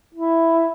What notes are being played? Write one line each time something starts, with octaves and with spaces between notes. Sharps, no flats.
E4